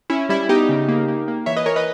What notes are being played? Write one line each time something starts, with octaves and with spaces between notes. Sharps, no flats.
C#4 E4
G3 E4
B3 D#4 G4
C#3
A#3
A#3
A#3
E3 C#5 E5
B4 D#5
E3 A#4 C#5
B4 D#5